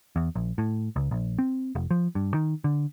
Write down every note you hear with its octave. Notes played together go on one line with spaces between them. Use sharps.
E2
A#1
A2
C#2
A#1
C4
F1
F3
G2
D#3
D3